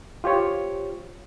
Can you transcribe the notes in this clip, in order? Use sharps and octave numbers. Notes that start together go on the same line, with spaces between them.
F4 G4 C5 C#5